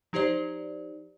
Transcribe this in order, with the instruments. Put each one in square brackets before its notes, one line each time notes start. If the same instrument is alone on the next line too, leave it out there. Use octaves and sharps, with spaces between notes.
[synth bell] F3 D#4 G4 C5 D5